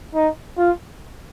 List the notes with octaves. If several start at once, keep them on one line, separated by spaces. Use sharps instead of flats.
D#4
F4